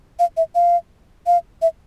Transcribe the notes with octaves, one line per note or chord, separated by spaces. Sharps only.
F5
E5
F5
F5
E5